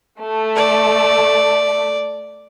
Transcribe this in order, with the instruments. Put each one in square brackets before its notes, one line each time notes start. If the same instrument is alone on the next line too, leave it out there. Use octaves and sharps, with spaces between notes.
[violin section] A3
[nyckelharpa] D5